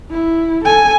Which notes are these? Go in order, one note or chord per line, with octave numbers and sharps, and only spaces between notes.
E4
A4 G#5